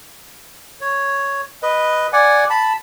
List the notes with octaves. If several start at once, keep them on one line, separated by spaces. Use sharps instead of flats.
C#5
B4 D#5
D5 F#5 G#5
A5 B5